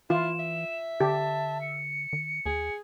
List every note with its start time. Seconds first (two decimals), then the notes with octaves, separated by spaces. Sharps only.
0.10 E3 E4 F4 E7
0.39 E5
1.00 D3 G4 A5
1.61 C#7
2.13 D#3
2.46 D#2 G#4